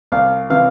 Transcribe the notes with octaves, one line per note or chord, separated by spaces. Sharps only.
C2 F5
C3 E3 F5